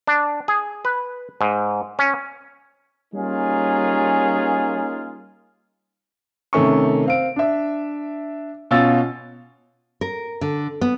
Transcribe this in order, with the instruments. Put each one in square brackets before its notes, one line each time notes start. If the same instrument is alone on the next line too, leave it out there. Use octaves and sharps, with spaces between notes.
[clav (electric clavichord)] D4
G#4
B4
G#2
C#4
[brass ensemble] G3 A#3 C#4 D#4 F4 G#4
[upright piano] C3 D#3 A3 C#4 C#6
C4 F5 D7
D4 E5
B2 C#4 F4 E6 A6
[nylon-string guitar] A#4
D3
B3